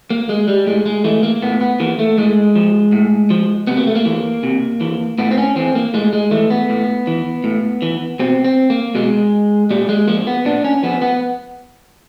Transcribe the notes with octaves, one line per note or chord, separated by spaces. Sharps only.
A#3
G#3
G3
A2 G#3
G#3
E3 A3
A#3
A2 B3
B3
E3 A#3
A3
A2 G#3
F3
A2
F3
C3 B3
A#3
A3
A#3
E3
C3
E3
A2 B3
C4
C#4
E3 C4
A#3
A2 G#3
G#3
E3 A3
B3
A2
E3
A2
E3
B2 C4
C4
A#3
B2 G#3
A#2 G3
G#3
F3 A#3
B3
A#2 D4
C#4
F3 B3
B3